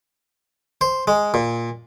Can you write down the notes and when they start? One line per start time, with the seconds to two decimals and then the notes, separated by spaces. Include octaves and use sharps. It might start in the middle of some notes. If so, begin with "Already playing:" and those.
0.81 C5
1.07 G#3
1.34 A#2